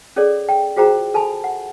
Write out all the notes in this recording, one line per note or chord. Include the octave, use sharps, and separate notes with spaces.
C#4 G#4 A4 C#5 D5
G5
F4 F#4 G#4 C5 G5 A#5
A4 G#5 A5 B5
F#5